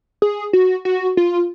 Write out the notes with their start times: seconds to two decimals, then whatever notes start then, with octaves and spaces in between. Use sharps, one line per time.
0.22 G#4
0.53 F#4
0.85 F#4
1.17 F4